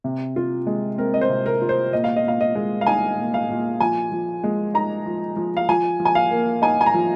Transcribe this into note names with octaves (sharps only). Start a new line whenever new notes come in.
C3
F4
G#3
C4 A#4
D#5
C5
C3
A#4
F4
C5
A#2 D#5
F5
D#5
A#2 F5
D#5
G#3
F5
D#4 G#5
A#2
F5
A#2
F3 G#5
F3
G#3
D#4 A#5
F3
F3
F5
F3 G#5
F3
G#5
F5
A#3
D#4 G#5
G#5
A#5
F3